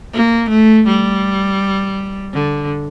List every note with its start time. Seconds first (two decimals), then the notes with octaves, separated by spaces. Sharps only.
0.13 A#3
0.50 A3
0.87 G3
2.34 D3